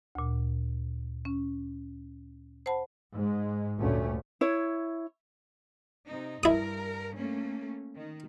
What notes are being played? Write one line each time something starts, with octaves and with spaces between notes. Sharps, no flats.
D2 A#2
C#4
C5 F#5 A5 B5
G#2 G#3
D2 G2 A#2 A3 C#4
E4 C#5
C3 D#4
G2 E4 A#4 D#6
A3 A#3 C#4
D#3